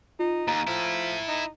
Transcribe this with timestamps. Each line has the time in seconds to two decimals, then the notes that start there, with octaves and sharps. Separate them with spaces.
0.19 D#4 F4
0.48 D#2 A#5
0.67 F3 E4 A4
1.28 D#4